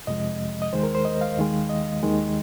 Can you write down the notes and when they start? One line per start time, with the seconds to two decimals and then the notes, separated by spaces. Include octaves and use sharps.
0.07 F2 C3 F3 G#3 D#5
0.62 D#5
0.72 D#2 D#3 G#3 C5
0.83 A#4
0.95 C5
1.05 D#5
1.21 F5
1.38 D#2 D#3 G#3
1.69 D#5
2.03 D#2 D#3 G#3